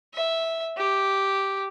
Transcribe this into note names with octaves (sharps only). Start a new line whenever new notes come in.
E5
G4